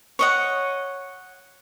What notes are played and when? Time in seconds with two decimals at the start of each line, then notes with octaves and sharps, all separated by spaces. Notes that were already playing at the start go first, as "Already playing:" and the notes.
0.19 C#5 D#5 F#5